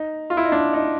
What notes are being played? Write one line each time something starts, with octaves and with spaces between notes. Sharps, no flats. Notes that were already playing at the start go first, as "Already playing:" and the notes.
Already playing: D#4
F4
E4
D#4
D4
D#4